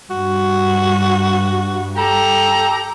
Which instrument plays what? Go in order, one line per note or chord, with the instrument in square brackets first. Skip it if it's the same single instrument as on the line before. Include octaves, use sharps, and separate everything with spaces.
[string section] G2 [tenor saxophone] F#4
[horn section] G4 A4 A#5